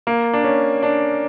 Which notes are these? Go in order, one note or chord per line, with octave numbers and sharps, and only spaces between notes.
A#3
D4
C#4
D4